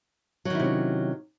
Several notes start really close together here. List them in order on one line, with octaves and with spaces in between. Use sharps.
F#3 D#3 E4 C3 C#4